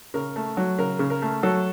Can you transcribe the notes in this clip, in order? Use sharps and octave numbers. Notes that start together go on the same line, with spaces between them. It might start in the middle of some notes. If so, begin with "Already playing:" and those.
C#3 A#4
A3
F#3
C#3 A#4
C#3
A#4
A3
F#3 A4